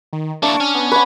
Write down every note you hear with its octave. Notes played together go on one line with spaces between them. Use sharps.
D#3
A#3 D4 E4 A5 C#6
C#4 F6
B3
B4 F#5 C#6 G#6